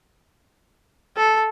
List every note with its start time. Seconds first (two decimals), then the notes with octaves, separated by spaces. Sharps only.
1.17 A4